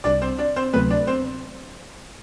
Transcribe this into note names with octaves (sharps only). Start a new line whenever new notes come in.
C2 C3 G3 D4 D5
C4 C5
D4 D5
C4 C5
D2 C3 F#3 A3 B3 B4
D4 D5
C4 C5